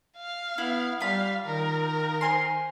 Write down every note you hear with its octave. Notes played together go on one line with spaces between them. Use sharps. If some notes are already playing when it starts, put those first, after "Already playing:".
F5
B3 E4
G3 F4 F5 B5
D#3 A#4
C5 G#5 C6